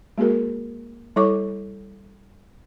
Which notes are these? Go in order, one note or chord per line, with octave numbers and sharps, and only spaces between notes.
G#3 A#3 F#4 G#4 A#4
G3 E4 A4 C#5 C#6 D6